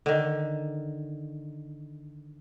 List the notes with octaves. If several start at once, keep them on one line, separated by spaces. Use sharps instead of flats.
D3 D#3